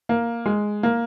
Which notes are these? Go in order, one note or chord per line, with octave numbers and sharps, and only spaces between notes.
A#3
G#3
A#3